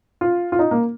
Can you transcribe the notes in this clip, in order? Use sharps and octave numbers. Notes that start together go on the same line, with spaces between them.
F4
F4
D#4
A#3